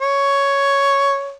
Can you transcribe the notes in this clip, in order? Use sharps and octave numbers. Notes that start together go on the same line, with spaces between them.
C#5